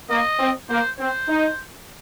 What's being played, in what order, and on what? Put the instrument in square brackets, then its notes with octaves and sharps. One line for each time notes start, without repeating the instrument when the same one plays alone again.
[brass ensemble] A#3 [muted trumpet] D#5
[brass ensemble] C4
[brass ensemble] A#3 [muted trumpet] C5
[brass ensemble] C4 [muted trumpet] C5
[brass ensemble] D#4